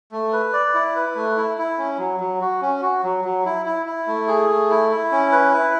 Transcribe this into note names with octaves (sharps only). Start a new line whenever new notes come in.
A3
B4
D5
E4
B4
A3
E4
E4
C#4
F#3
F#3
F#4
C#4
F#4
F#3
F#3
E4
E4
E4
A3
G#4
A3
E4
E4
C#4
B4
E4